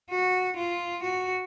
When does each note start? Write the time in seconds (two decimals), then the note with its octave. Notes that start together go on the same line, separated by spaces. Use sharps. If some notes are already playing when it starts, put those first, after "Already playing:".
0.11 F#4
0.57 F4
1.03 F#4